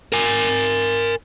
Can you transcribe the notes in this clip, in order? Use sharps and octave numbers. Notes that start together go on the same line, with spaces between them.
A#4 G#5